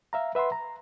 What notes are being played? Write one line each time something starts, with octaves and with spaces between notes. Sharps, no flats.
E5 F5 A#5
B4 E5 F#5 B5 C6
A#5